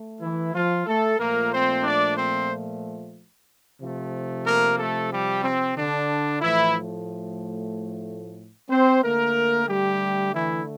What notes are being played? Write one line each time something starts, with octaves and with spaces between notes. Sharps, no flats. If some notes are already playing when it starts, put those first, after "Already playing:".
Already playing: A3
E3 E4
F3 F4
A3 A4
A#2 F3 A3 A#3 A#4
C4 C5
D4 D5
C4 C5
C3 F3 A3
A#3 A#4
A3 A4
G3 G4
C4
D3 D4
A2 E3 F3 A3 E4
C4 C5
D3 A3 A#3 A#4
G3 G4
E3 E4